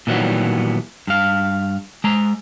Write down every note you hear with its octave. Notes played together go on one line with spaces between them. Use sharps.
A#2 D#3 E3 F#3 G3 B3
G2 F5
G#3 A#5